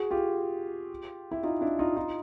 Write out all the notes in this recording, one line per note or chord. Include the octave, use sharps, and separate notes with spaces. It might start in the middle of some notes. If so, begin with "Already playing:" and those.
Already playing: F#4 G#4
F4 G4
E4
D#4 F4
D4 E4
D#4 F4
D#4 F4